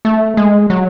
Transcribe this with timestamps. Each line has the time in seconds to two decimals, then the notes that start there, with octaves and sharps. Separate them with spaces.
0.05 A3
0.37 G#3
0.70 F#3